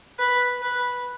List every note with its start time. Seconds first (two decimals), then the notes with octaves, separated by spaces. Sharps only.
0.19 B4
0.62 B4